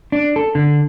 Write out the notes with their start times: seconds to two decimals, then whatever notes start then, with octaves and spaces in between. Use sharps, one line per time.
0.12 D4
0.36 A4
0.55 D3